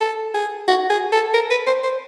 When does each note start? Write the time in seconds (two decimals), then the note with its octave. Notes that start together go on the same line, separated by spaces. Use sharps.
0.01 A4
0.34 G#4
0.68 F#4
0.90 G#4
1.12 A4
1.34 A#4
1.50 B4
1.67 C5
1.83 C5